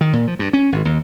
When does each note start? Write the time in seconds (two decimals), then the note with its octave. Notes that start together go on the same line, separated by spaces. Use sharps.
0.01 D#3
0.13 A#2
0.27 F3
0.39 G2
0.53 C#4
0.72 G#1
0.85 D#2